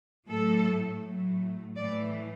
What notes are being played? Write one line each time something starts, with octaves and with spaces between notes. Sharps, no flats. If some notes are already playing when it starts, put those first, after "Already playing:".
A2 F#3 A3 A4
A2 F#3 A3
A2 E3 A3 D5